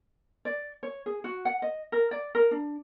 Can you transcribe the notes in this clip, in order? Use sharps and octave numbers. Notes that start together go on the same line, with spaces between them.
D5
C#5
G#4
F#4
F#5
D#5
A#4
D5
A#4
D4